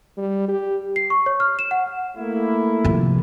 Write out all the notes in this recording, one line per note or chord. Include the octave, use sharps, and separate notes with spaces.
G3
G4
C7
C#6
C#5
F6
E7
F#5
A3 A#3 E4
C3 F3